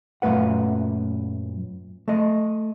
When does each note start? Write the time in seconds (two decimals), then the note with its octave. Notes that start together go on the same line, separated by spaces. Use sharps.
0.22 F#2 A#2 A3 B4 F#5
2.08 A3 D#5